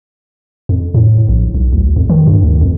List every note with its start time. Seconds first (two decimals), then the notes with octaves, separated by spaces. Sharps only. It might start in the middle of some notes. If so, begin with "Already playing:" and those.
0.69 F2
0.94 A2
1.29 A#1
1.55 B1
1.72 D2
1.96 F2
2.09 D#3
2.27 G2
2.42 D2
2.61 F2